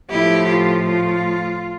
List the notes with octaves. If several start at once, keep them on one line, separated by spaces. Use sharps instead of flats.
A2 F3 A3 E4 G4
F4
F4